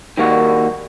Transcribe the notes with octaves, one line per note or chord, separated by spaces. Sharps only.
D#3 G3 A#3 D#4 F#4